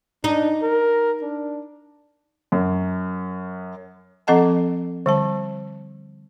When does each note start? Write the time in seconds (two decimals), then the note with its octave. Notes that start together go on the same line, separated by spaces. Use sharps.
0.24 D4 D#4
0.62 A#4
1.22 D4
2.52 F#2
4.27 F3 C4 A4 D#5 F#5 A5
5.06 D3 G3 A5